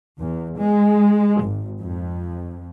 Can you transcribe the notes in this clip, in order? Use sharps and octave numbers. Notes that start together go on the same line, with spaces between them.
E2
G#3
G#1
F2